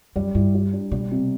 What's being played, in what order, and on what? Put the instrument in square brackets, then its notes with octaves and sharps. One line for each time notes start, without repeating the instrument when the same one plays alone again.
[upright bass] F#2 [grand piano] G3
[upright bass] G2 [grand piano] E4
[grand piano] G3
D4
[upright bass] B2 [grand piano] G3
[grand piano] C3